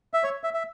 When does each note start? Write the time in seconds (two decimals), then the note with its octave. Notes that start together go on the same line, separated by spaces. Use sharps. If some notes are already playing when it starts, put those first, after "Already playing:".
0.14 E5
0.23 C#5
0.44 E5
0.54 E5